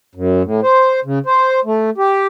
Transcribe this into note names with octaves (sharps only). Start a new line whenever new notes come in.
F#2
A2
C5
C#3
C5
A3
G4